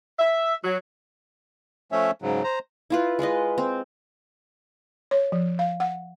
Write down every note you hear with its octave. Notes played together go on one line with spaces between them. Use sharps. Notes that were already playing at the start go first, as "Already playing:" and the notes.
E5
F#3
F3 A3 C#4 C#5 E5
G#2 C#3 F#3
C5 A#5
E4 F4 B4
G#3 F4 B4 D#5
C4
C#5
F3
F5
F#5